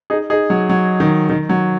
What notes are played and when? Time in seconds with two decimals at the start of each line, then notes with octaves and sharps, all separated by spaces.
0.10 D#4 G#4
0.30 D#4 G#4
0.50 F#3
0.69 F#3
1.00 D#3
1.29 D#3
1.49 F#3